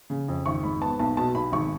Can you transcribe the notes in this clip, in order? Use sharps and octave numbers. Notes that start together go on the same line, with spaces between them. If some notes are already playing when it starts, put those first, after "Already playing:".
C#3
F2
G#1 C#6
G#2 B5
B3 A5
B1 A5
B2 A5
B1 B5
G#1 C#6